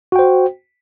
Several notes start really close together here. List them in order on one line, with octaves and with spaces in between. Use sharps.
F#4 G5 C5